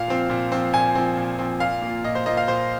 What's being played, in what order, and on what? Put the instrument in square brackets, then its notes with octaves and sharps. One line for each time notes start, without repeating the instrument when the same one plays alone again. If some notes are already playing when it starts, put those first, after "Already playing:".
Already playing: [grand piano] A#2 F5
F3 C4
A#2
F3 C4
A#2 G#5
F3 C4
A#2
F3 C4
A#2 F5
A#3
F4
A#2 D#5
C5
A#3 F4 D#5
F5
A#2 C5